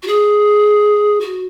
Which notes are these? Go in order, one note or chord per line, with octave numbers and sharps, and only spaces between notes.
F#4
G#4
F#4